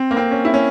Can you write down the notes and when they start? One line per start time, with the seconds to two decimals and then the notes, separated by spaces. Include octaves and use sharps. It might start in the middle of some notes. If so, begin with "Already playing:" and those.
Already playing: C4
0.11 A#3
0.17 C4
0.31 C#4
0.45 E4
0.54 C#4